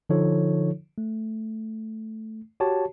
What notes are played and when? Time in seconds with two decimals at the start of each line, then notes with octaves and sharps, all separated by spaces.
0.09 D3 F3 D#4 F4 A4 C#5
0.98 A3
2.60 F#4 G4 C#5 A5